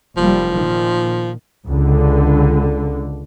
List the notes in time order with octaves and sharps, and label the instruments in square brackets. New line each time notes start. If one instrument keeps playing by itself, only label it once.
[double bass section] F1 G3 A#3 [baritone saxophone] F3
[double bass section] A#2 D#3
C#2 D3